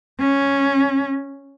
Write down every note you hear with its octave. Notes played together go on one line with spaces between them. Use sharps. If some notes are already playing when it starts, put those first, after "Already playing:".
C#4